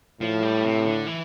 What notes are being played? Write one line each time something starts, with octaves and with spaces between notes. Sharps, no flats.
A2 F3
G3
C3
D3
E3